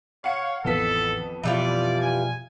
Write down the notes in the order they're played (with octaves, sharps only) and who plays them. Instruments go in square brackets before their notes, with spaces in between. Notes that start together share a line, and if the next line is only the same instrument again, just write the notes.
[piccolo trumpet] C#5 [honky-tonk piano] F5 F#5 C#7
[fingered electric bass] A1 D#3 E3 [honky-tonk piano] F2 B3 B6 [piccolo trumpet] A4
[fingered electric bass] B2 F3 [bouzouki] E3 G3 F4 [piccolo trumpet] D5
[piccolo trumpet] G#5